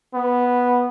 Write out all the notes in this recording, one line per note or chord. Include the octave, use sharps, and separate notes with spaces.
B3